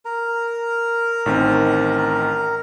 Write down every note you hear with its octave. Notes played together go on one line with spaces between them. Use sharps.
A#4 A#5
A1 D#3 C4